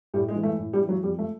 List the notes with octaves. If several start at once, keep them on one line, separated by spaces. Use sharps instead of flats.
A2 G3
G#3
E3
A3
A2
G3
E3
F#3
F2 G3
A3